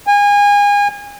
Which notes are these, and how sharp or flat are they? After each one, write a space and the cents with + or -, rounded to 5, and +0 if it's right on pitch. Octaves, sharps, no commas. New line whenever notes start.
G#5 -30